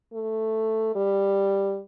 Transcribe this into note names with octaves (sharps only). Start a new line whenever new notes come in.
A3
G3